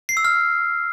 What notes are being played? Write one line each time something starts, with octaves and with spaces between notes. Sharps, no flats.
C7
E6
F6